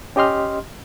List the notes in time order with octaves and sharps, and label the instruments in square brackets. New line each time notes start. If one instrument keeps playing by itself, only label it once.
[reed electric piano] C#4 G4 D#5 C6 F6